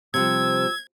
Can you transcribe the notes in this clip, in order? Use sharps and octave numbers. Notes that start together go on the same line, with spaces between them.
C3 F3 G3 E6 G#6